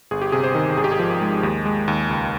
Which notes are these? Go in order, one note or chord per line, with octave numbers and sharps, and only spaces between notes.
G1 G#4
G4
C3 G#4
C5
D#3
G#1 G#4
G4
G#4
F3
G#3
D#2
G#3
D#2
C#2